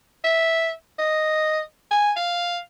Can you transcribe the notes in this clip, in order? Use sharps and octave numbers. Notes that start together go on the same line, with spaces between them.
E5
D#5
G#5
F5